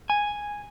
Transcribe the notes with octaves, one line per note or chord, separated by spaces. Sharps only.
G#5